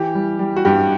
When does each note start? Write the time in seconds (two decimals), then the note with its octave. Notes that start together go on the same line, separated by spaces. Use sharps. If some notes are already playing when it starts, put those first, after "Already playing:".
Already playing: E3 G4
0.15 G3
0.39 G3
0.56 F#4
0.65 G2 G4